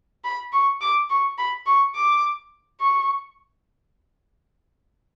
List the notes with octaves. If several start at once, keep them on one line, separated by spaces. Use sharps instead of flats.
B5
C#6
D6
C#6
B5
C#6
D6
C#6